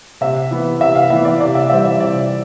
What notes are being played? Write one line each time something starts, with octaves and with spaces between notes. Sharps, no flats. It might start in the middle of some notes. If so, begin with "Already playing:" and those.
C3 E5
E3 B3
C3 E5
F5
E3 B3 E5
D5
C3 D5
E5
E3 G3 C4 E5
E5
C3 D5